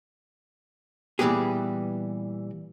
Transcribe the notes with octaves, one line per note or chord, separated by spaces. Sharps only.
A#2 E3 G3 B3 G4 G#4